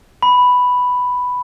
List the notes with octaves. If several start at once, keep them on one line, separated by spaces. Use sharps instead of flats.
B5